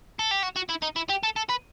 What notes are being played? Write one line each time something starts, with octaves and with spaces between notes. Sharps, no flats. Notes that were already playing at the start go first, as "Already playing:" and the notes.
A4
G4
F#4
F#4
E4
D#4
E4
G4
A4
A4
B4